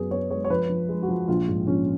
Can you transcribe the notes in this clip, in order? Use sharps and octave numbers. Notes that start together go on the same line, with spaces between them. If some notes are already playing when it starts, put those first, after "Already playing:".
Already playing: F#2 B3 G#4
B3 C#5
G#3 C#5
C#5
F3 B4
F3
G#3
F#4
F3
A#1 F4
G#2
A#1 C#4